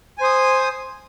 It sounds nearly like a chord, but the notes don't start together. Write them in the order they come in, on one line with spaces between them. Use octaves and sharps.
G#5 C5 D#6